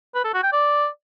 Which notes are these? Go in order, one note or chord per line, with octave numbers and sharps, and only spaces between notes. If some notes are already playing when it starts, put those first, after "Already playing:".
B4
A4
F#4
G5
D5